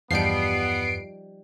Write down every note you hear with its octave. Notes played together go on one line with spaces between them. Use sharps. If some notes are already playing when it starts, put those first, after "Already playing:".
E2 G2 F3 G3 B3 D#4 C7 D7